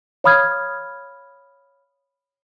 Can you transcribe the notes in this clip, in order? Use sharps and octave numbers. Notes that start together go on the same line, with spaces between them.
C#5 F5 B5 D#6 F6 G#6